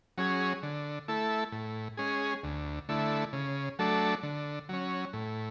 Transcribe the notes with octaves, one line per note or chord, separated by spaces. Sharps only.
F#3 C#4 G#4
D3
A3 E4 A4
A2
G#3 C#4 G#4
D2
D3 A3 E4
C#3
F#3 A3 D4 A4
D3
F#3 C#4
A2